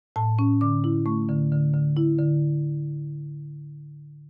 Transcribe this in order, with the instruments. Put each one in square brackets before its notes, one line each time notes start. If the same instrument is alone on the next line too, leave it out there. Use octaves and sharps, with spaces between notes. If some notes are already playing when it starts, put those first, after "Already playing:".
[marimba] A2 A5
C#4
D3 D6
E4
A3 C#6
D3
D3
D3
E4
D3